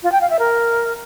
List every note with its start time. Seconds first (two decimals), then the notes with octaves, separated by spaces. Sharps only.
0.03 F4
0.12 G5
0.21 F5
0.30 E5
0.39 A#4